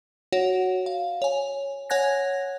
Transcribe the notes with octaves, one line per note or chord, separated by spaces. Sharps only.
F#4 C#5 F#5
F5
C#5 G#5
C#5 F#5 G#5 F#6 G#6 A#6